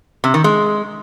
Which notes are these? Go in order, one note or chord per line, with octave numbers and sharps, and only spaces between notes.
C3
D#3
G#3